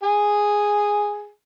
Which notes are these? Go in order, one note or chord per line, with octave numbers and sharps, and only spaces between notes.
G#4 G#5